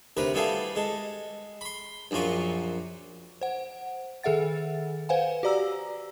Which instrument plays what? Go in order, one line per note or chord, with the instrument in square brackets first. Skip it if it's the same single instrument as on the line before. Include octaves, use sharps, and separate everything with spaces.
[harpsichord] D2 C3 A#4 B4
G3 B3 E4 G#4 A4 F5
G#3 A4
B5 C6
A#1 F#2 A#2 F4 F#4
[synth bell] C5 F#5
D#3 G#4 A4 E5 F#5 A6
B4 C5 F5 F#5 G#5
F#4 G4 D5 A#5 E6